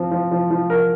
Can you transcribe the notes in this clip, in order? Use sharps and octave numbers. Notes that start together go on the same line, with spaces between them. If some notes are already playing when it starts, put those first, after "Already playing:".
Already playing: F3 C4
F3
F3
F3
A#4